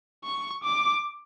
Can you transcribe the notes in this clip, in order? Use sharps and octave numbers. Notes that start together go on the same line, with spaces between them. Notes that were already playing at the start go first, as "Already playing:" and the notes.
C#6
D6